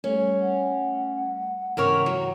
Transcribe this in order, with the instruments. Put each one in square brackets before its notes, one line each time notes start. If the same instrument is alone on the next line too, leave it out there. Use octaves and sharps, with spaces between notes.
[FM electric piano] G3 A3 [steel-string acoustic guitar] C#4
[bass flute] F#5
[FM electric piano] G#2 C#3 E3 [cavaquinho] E4 A#4 C#5 [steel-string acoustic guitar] G4
[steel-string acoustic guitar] F#3 F#4